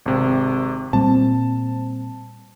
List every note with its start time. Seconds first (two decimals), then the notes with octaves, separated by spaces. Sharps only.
0.06 G#1 C3
0.93 A#2 G3 C4 A5